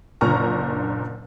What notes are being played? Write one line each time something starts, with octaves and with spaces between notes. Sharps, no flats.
F#1 A#2 D3 A#5 C#6 F6